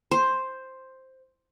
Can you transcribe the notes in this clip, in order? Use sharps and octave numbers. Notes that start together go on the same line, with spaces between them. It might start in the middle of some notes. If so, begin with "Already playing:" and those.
C5